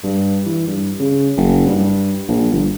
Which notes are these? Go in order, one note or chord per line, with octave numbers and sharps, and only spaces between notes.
G2
E3
G2
C#3
F#1
G2
A#1
G1